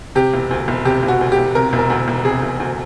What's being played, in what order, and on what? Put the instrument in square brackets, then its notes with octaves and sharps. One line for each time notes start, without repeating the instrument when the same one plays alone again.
[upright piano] C3 G4
E1
D2
E1
C3 G4
E1
F#4
D2
G4
E1
C3 A#4
E1
A#4
D2
E1
C3 G#4
E1
D2